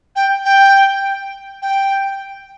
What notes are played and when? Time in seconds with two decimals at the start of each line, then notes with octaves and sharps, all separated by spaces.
0.16 G5
0.45 G5
1.62 G5